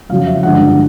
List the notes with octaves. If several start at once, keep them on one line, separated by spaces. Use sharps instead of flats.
F2 C#3 F#3 F5
E5
G2 D3 F3 G#3 F#5